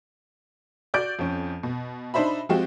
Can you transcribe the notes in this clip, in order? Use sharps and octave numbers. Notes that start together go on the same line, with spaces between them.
F#4 D5 G6 D7
F2 C#4
B2
D4 D#4 C5 E5 B5
F3 G#3 C4 F#4 G4